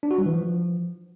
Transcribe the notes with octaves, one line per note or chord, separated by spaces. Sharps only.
D4
F#4
G3
E3
F3